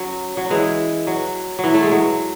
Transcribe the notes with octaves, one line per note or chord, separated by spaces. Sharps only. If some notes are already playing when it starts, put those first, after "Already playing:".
Already playing: F#3 C#4
F#3
E3 G#3
F#3
E3 F#3
A3
G#3
F#3